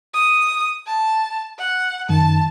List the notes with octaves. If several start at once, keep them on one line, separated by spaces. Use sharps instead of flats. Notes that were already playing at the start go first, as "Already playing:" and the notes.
D#6
A5
F#5
F#2 D#3 A5